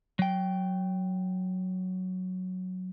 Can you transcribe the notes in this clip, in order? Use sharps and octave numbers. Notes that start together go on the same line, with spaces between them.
F#3 G5